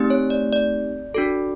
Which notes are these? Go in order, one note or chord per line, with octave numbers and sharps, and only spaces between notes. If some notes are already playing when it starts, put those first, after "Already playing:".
Already playing: A3 C4 D#4 G4
C#5
D5
D5
D4 F#4 A4